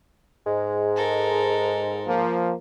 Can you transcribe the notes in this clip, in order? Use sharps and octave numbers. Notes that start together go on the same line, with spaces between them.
G#2 G#3
A4 A#4
F3 A#3